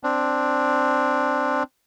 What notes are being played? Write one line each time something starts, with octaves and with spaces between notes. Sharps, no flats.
C4 D4